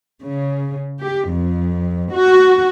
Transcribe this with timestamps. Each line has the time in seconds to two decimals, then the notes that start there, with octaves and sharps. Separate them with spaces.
0.23 C#3
1.03 G4
1.31 F2
2.14 F#4